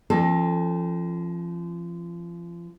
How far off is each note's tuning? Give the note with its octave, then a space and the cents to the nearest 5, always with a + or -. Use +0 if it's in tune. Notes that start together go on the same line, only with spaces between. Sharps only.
F3 -30 C4 +45 A4 +0